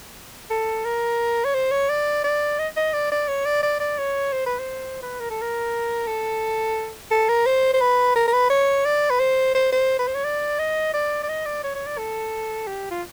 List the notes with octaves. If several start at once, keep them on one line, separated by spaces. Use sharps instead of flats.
A4
A#4
C#5
C5
C#5
D5
D5
D#5
D#5
D5
D5
C#5
D5
D5
D5
C#5
C5
B4
C5
B4
A#4
A4
A#4
A4
A4
A#4
C5
C5
B4
A#4
A#4
B4
C#5
D5
B4
C5
C5
C5
B4
C5
C#5
D5
D#5
D5
D5
D#5
D5
C#5
C#5
D5
A4
G4
F4